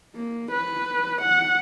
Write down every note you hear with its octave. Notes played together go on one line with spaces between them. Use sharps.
A#3
B4
F#5